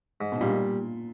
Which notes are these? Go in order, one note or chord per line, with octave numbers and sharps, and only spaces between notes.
G#2
B2
A#2 G3